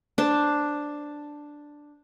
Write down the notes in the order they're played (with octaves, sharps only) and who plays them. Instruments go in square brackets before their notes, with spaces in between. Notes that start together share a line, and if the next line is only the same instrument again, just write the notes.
[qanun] D4 C5 A5